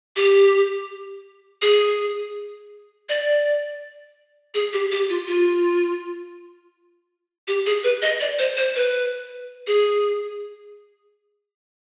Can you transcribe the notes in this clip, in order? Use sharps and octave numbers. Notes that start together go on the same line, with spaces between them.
G4
G#4
D5
G#4
G4
G4
F4
F4
G4
G#4
B4
D#5
D5
C5
C5
B4
G#4